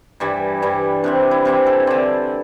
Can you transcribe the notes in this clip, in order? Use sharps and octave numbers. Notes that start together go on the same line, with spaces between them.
G2 E3 G3 D5
G2 E3 G3
C3 E3 C4 D4
E4
C3 E3 C4
A4
D3 C4 D5